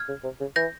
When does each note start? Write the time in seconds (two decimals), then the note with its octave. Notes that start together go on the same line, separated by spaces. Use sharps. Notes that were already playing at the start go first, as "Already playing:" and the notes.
Already playing: F6 G#6
0.08 C#3
0.24 C3
0.40 C#3
0.56 E3 G6 A#6